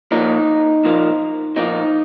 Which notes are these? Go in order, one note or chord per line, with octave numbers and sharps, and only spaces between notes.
A#2 F3 A#3 D#4
A#2 F3 A#3
A#2 F3 A#3 D#4